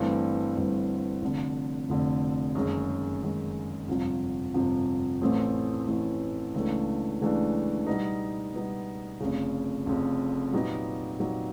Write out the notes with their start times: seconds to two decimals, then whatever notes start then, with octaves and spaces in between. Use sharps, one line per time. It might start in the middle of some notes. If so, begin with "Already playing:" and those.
Already playing: G1 G2 E3 A3 C4
0.56 G1 G2 E3 A3 C4
1.21 F1 F2 D3
1.89 F1 F2 D3
2.55 F#1 F#2 D#3 G#3
3.22 F#1 F#2 D#3 G#3
3.87 G1 F2 C3 F3
4.54 G1 F2 C3 F3
5.21 A1 A2 E3 A3 C4
5.87 A1 A2 E3 A3 C4
6.54 C#2 C#3 E3 A3 D4
7.21 C#2 C#3 E3 A3 D4
7.87 B2 G3 B3 D#4
8.53 B2 G3 B3 D#4
9.20 F1 F2 C#3
9.86 F1 F2 C#3
10.53 A#2 F#3 B3 D#4 G4
11.19 A#2 F#3 B3 D#4 G4